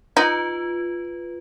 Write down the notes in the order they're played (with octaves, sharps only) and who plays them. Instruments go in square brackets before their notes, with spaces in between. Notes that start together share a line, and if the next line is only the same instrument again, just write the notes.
[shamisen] D#4 [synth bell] F4 B4